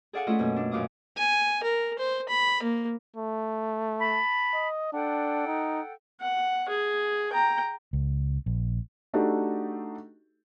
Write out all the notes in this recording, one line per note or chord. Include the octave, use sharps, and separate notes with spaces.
G#4 A4 D5 F5 F#5 G#5
A3 C#4 E4 F4 D#5
F#2 B2 A#3
D4
F#2 A#2 F5 D6 D#6
G#5
A#4
C5
B5
A#3
A3
A5 B5
D#5
D4 A4 F#5 G5
D#4
F#5
G#4
G5 A#5
C#2
A#1
A3 D4 D#4 F#4 G4 A4